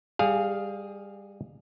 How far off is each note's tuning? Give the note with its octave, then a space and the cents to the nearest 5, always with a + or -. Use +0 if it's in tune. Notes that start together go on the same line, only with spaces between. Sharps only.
G3 +25 G#4 +0 F5 +0